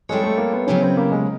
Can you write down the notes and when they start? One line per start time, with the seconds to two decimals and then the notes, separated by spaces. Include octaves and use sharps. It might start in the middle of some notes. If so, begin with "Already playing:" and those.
0.09 G3 G#3 C4 E4 A4 C#5
0.23 A3
0.38 A#3
0.53 B3
0.67 C#3 F#3 B3 C#4 E4 G4
0.82 C4
0.97 A#3
1.12 G#3